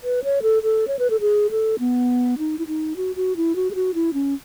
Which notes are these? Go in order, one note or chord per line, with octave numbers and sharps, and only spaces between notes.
B4
C#5
A4
A4
C#5
B4
A4
G#4
A4
B3
D#4
E4
D#4
F#4
F#4
E4
F#4
G#4
F#4
E4
C#4